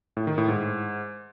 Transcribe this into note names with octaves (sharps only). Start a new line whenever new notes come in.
A2
D#3
A2
G#2